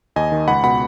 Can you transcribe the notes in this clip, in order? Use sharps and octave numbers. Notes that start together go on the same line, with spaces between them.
D#2 D#5 G#5
D#3
C#2 F#5 B5
B2 F#5 B5